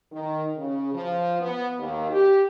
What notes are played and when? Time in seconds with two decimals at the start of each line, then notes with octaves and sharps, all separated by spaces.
0.12 D#3
0.56 C#3
0.93 F3
1.41 B3
1.79 D#2
2.10 G4